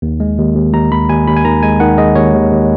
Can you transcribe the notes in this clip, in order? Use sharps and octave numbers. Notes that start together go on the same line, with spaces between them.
D#2
G#3
D#2
D#2
D#2 A#5
D#2 B5
D#2 G#5
D#2 B5
G#5
D#3 A#5
G#3 G#5
D#3 F#5
G#3 D#5
D#2 C#5
D#2
D#2